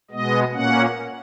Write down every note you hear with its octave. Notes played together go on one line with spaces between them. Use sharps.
B2 G#3 B3 D#5
A#2 A#3 C#4 F#5